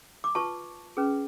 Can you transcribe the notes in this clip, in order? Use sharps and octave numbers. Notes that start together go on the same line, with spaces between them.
D6
F4 B4 A5 C#6
C#4 G#4 B4